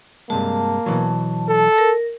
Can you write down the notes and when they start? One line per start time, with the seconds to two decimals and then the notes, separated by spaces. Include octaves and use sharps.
0.30 G2 C3 G#3 A#3 A5
0.86 B2 E3 F#3
1.49 A4
1.78 A#4